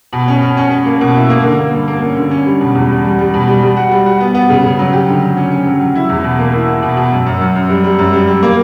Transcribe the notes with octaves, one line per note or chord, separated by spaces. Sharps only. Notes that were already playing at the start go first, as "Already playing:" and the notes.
B2
C#4
C#4
C#4
C#4
A#3
B2
E4
A#3
D3
A#3
G2
A#3
C#4
D3
C#4
G3
B2
E2
G3
G3
G3
B2
G3
G3
F#4
G3
F#4
B3
B3
C#3
C#3
F#3
G4
D3
F#3
C#4
C#4
F#3
F#3
E4
E2
B2
A#3
E4
E4
B2
B2
F#2
F#2
F#2
F#2
G3
G3
F#2
G3
G3
A#3